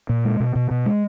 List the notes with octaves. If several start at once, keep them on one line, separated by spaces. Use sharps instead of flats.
A#2
G#3
B2
B2
B2
G#3